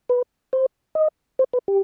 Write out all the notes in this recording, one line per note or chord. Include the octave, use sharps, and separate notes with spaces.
B4
C5
D#5
C5
B4
G4